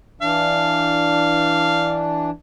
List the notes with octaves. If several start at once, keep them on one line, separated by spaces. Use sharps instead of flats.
E3 D4 F5